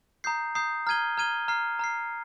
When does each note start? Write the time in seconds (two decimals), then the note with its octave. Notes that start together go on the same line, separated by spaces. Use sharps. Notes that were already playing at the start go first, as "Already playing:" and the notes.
0.24 A#5 D#6 G6 C7
0.55 A#5 D#6 G6 C7
0.87 A#5 F6 G#6 D#7 G7
1.17 A#5 F6 G#6 D#7 G7
1.48 A#5 F6 C7
1.79 A#5 F6 C7